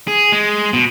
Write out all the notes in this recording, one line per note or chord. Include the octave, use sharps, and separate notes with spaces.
G#4
G#3
B2